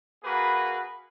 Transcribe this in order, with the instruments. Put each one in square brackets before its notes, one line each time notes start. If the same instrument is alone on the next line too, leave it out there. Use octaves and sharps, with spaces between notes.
[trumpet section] A#3 F#4 G#4 A#4 B4